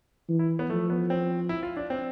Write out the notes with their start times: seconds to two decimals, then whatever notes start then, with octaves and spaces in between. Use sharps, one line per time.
0.29 E3
0.39 E4
0.59 B3
0.70 F3 A3
0.90 B3
1.10 C4
1.49 E4
1.63 F4
1.77 D4
1.90 C4